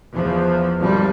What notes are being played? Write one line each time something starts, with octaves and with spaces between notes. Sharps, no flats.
E2 F3
G#1 F3 G3